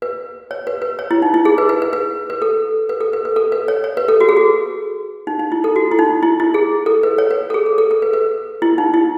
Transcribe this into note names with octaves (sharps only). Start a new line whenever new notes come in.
B4
C#5
B4
B4
C#5
E4
D#4
E4
G#4
B4
B4
B4
B4
B4
A4
B4
A4
B4
B4
A4
B4
C#5
C#5
B4
A4
F#4
G#4
F#4
D#4
D#4
E4
A4
F#4
E4
D#4
E4
E4
G#4
A4
B4
C#5
B4
A4
G#4
A4
A4
A4
B4
B4
E4
D#4
E4